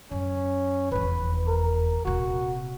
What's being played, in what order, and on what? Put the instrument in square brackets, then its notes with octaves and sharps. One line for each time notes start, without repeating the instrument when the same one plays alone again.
[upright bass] F#2 [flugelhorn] C#4
[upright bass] F1 E2 [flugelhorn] B4
[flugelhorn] A#4
[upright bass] D#1 C3 [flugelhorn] F#4